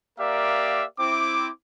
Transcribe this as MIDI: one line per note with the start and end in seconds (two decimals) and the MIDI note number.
0.19 0.83 58
0.19 0.83 67
0.19 0.83 70
0.19 0.83 74
0.19 0.83 76
0.19 0.83 77
0.99 1.49 60
0.99 1.49 64
0.99 1.49 86